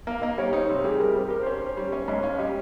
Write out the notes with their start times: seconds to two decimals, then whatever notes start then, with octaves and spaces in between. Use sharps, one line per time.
0.07 A#3 F5
0.22 A#3 D#5
0.38 G3 C#5
0.53 D#4 C5
0.69 C3
0.84 G3 G#4
0.99 G3 A#4
1.15 G3 C5
1.28 G4 A#4
1.43 C#4 C5
1.62 C#4
1.77 G3
1.92 C#4 C#5
2.08 G#2 D#5
2.23 C#4 F5
2.39 G3 D#5